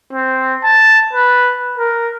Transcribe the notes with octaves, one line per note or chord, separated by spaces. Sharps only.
C4
A5
B4
A#4